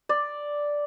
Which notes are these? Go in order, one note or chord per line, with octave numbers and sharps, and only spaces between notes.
D5